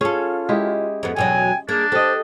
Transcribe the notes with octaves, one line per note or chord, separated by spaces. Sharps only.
C#4 F4 G#4 A4
G#3 E4 G4
F2 B3
E2 B2 F#3 G5 G#5
A#3 D4 G#4
G4 A4 C5 D#5